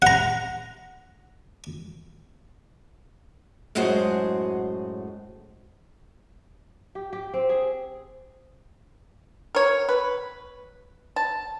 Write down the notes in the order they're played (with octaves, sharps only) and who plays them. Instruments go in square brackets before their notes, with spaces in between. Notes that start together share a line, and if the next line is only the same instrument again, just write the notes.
[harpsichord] F#5 A#5
[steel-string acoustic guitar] F#2 A2 G#3 F#4 G#4 C5
[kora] G4
G4
C4
G#4
[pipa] A#4 C#5
B4
A5